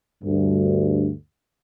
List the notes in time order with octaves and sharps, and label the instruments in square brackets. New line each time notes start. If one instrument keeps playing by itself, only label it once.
[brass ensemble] D2 G2